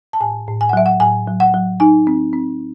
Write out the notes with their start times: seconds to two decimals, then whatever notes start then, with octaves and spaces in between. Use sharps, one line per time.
0.13 A5
0.21 A2 G#5
0.47 A2
0.61 G#5
0.69 F#5
0.73 F#3 E5
0.86 F#5
1.00 A2 G#5
1.28 F#3
1.40 F#5
1.54 F#3
1.80 D#4 G#5
2.07 C4
2.33 C4